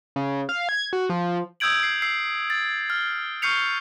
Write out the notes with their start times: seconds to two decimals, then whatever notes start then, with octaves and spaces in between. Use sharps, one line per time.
0.16 C#3
0.49 F5
0.69 G#6
0.93 F#4
1.10 F3
1.60 D#6 E6 G6 G#6 D7 F#7
1.83 C7
2.02 E6 C7
2.50 A6
2.90 F6
3.42 C#6 F6 G6 C7 C#7 F7